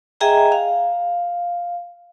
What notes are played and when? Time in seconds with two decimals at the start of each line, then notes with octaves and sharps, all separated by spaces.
0.21 G#4 D#5 E5 G5 G#5 A#5
0.52 F5